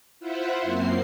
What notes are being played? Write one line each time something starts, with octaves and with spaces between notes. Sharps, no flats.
E4 F4 C5 E5 F#5
F#2 A#3 C4 C7